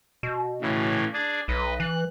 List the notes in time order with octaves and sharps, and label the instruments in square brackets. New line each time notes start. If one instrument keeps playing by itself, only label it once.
[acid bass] B2
[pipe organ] A2 C#3 E3
D4 G#4 D5
[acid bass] B1 [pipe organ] B4 D#5
[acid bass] E3 [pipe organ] F#6